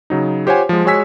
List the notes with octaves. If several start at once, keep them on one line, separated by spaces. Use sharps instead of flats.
C#3 F#3 D#4
F4 G4 C5 C#5 F#5 G#5
F3 G#3
G#3 F#4 C#5 G#5 E6 B6